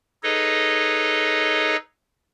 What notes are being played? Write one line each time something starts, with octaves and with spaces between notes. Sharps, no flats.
D#4 G#4 A4 B4 C#5 D#5